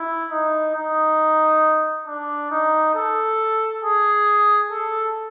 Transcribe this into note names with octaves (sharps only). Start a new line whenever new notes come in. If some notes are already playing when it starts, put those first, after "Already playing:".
Already playing: E4
D#4
D#4
D4
D#4
A4
G#4
A4